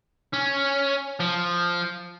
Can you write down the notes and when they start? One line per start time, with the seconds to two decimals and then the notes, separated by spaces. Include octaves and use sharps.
0.34 C#4
1.20 F3